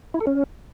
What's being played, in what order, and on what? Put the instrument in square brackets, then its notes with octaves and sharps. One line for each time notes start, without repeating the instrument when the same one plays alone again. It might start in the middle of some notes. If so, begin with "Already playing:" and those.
[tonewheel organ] E4
A4
C#4